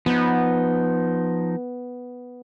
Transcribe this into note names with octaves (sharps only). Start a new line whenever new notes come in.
F3 B3 D#4